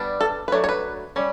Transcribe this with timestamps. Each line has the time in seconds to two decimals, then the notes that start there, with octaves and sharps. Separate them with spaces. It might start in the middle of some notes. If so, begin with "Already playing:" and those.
Already playing: G3 B3 D4
0.21 A4
0.48 B4
0.52 F#3 A3 D4 C#5
0.64 C#5
0.69 B4
1.16 G3 C#4